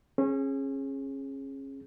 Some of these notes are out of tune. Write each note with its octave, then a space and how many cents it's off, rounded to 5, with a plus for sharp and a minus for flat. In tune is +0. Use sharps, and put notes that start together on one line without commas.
C#4 -30 G#4 +0